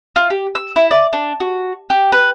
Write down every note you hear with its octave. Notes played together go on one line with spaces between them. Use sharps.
F4
G4
E6
E4
D5
D4
F#4
G4
B4